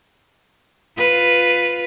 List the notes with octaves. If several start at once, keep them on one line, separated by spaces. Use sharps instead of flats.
F4 B4